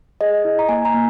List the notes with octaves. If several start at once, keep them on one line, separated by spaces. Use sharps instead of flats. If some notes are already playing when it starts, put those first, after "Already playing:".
G#4 D#5
E4
A#5
A#3 G#5
A#5
A#3